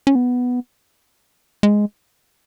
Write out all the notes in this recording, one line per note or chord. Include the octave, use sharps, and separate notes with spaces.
C#4
B3
G#3